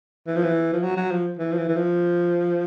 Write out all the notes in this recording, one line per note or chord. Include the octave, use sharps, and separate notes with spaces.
E3
F3
E3
F3
F#3
F#3
F3
E3
F3
E3
E3
F3